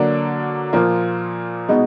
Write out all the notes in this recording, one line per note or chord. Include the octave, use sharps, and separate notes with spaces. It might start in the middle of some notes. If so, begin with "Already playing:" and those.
Already playing: D3 F#3 A#3 D4
A#2 F3 A#3 F4
B2 G#3 B3 D#4 F#4